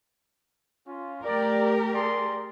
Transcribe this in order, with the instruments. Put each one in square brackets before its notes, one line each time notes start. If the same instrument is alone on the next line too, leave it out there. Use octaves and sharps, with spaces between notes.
[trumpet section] C#4 F4
[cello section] A3 G4 A#4 [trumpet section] D5
[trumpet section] G#4 D5 C6